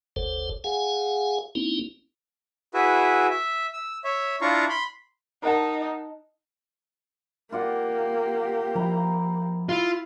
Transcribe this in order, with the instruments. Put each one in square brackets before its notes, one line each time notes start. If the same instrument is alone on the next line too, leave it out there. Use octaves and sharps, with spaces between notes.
[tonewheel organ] F#1 D2 A4 C5
G#4 F5 F#5 G#5
A#3 C4 C#4 D#4 E4
[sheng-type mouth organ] E4 F#4 G#4 B4 E5
E5
E6
C#5 E5
D4 E4 F4 F5 A#5 C#6
B5 C6
[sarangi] D#4 [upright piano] A#4 F#5 A5
[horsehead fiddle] A#3 G4 [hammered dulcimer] F4 D5 F#5
[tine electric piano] F3 [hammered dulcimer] E4 A#5
[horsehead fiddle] E4 [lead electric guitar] F4